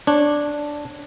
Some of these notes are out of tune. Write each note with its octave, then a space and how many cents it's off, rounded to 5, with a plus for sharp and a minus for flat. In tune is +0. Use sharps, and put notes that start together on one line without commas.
D4 +0 C#5 -15